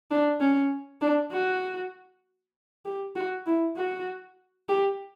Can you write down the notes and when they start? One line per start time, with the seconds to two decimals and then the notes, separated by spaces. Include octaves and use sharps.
0.11 D4
0.40 C#4
1.01 D4
1.32 F#4
2.85 G4
3.16 F#4
3.46 E4
3.77 F#4
4.69 G4